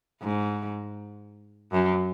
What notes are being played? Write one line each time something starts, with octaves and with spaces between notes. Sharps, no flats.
G#2
F#2